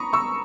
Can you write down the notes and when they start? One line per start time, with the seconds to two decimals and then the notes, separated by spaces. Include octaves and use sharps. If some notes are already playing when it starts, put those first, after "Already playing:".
Already playing: A#5 B5 C#6 D#6
0.13 C#6 E6